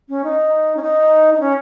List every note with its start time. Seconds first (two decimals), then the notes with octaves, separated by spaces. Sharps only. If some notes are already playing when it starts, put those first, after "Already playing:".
0.09 C#4
0.24 D#4
0.76 C#4
0.82 D#4
1.34 D#4
1.40 C#4